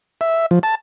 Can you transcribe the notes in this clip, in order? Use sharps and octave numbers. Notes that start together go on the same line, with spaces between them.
E5
F3
A5